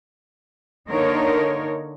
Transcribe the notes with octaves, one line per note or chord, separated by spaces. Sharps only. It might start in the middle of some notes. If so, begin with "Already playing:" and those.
D3 A#3 D#4 A#4 C#5